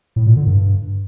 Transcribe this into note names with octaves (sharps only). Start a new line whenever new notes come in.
A2
A#2
D3
G2
G2